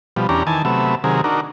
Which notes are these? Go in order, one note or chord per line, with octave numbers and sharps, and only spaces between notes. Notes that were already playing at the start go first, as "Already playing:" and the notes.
B2 F3 G3
E2 C#4 D4 G4 A#5
D#3 E3 G#5 A5
C3 F#3 A3 B3 E5
C3 D#3 F#3 G#4 A#4
D4 D#4 F#4 A#4